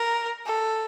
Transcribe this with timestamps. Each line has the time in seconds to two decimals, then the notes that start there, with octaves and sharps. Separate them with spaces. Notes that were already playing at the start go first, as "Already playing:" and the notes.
Already playing: A#4
0.47 A4